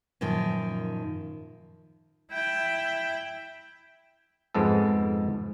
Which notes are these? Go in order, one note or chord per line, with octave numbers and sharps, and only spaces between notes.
F#2 A#2 D#3 F3
E4 G5
F2 G#2 G#3 B3 A4